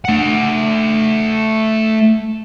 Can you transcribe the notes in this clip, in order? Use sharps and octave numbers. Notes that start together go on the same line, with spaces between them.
A3 F#5